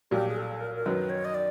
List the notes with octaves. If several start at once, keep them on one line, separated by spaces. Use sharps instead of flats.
B1 A#2 G3 G4
G#4
A4
A#4
A#4
F#2 D#3 F#3 B4
C#5
D#5
D5